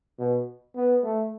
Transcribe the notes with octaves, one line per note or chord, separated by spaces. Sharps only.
B2
B3
A3